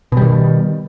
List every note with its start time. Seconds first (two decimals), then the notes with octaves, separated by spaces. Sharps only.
0.12 B2
0.17 G3
0.22 D#3